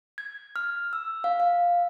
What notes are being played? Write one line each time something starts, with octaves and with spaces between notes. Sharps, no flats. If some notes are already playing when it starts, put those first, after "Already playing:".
G#6
F6
E6
F5
F5